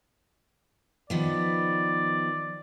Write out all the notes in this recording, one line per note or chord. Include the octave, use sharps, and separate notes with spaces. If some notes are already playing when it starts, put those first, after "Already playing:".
D#3 F3 B3 D5